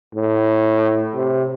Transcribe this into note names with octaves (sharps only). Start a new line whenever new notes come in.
A2
C3